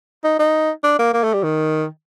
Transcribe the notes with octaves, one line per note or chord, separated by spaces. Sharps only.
D#4
D#4
D4
A#3
A#3
A3
G3
D#3